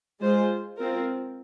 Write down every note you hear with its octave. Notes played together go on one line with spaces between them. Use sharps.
G#3 F4 G#4 C5
C4 F4 A#4